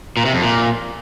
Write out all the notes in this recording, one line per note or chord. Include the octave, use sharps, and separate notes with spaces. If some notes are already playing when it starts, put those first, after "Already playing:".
A#2
C3
F2
A#2